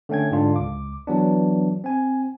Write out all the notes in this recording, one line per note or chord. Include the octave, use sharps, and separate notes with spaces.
D3 A3 C#4 G5 G#6
G#2 D3 D4 F4
C#2 D6
E3 F#3 B3 D4
C4 G#5